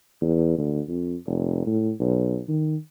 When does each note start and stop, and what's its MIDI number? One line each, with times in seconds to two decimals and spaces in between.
0.21 0.56 40
0.58 0.81 38
0.89 1.15 41
1.27 1.66 29
1.66 1.91 45
2.00 2.39 35
2.49 2.76 51